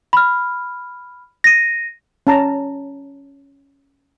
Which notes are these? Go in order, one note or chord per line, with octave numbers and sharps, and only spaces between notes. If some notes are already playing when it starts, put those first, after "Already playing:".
B5 F6
A#6 D#7
C#4 A5 A#5